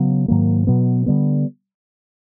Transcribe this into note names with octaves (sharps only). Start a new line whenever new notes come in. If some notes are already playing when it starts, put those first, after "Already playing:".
Already playing: C#3 F#3 B3
G#2 D#3 F#3 A#3
B2 F#3 B3
D3 G3 B3